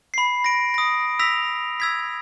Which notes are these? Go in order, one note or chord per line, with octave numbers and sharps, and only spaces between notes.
B5 C7
A#6 D7
D#6 A#6
E6 A#6 B6 F7
E6 G#6 B6